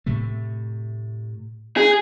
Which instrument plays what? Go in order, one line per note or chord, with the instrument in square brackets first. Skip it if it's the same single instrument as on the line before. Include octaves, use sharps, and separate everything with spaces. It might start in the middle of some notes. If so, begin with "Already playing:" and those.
[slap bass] A2 C3 A3
[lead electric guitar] G#4